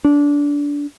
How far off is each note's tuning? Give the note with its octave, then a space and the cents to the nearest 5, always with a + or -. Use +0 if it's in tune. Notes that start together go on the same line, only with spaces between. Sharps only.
D4 -20